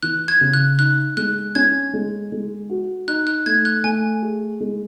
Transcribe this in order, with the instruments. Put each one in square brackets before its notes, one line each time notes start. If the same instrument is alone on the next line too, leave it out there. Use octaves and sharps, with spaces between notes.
[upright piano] E3 [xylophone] F#6
[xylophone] G#6
[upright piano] C#3
[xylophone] F#6
[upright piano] D#4 [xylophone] F#6
[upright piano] G#3 [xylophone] F#6
[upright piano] C#4 [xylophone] G#6
[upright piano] G#3
G#3
F#4
[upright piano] D#4 [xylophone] F#6
[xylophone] F#6
[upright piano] A3 [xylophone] G#6
[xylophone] F#6
[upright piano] A3 [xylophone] G#5
[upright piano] G#4
G#3